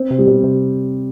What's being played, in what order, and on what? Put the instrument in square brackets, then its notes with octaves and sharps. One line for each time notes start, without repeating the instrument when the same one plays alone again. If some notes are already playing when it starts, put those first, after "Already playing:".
Already playing: [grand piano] C4
[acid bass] C3
[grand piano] G3
[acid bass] B2
C3